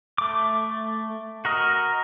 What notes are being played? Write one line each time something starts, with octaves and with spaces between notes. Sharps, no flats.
A3 D6
F#4 A#4 D#5